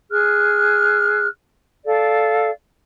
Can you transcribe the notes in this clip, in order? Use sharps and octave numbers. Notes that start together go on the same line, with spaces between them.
G#4 F6 F#6
A4 D5 F5